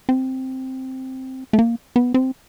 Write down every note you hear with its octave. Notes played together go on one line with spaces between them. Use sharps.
C4
A3
A#3
B3
C4